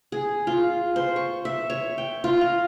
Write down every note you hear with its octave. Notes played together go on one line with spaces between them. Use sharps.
G#4
F4
C5
C#6
E5
C#5
G5
F4
A#5